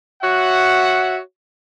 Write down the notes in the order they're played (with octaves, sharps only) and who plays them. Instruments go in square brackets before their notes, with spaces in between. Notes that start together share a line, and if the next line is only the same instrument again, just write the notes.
[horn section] F#4 C#5 E5 F#5